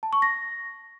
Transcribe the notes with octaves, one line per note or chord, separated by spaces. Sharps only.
A5
C#6
A#6